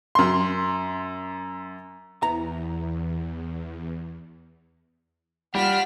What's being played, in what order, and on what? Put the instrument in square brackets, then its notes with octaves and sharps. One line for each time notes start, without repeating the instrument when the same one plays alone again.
[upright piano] F#2 C6
[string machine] E2 [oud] B3 E4 [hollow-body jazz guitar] A#5
[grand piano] G3 [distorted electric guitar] D4 [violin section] F4 F6 B6 [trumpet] F#5